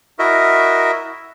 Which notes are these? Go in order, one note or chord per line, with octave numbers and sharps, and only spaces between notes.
E4 F#4 A#4 D#5 E5